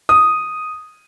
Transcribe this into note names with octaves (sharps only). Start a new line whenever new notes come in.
D#6